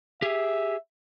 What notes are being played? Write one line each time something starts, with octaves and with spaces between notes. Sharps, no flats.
G4 G#4 E5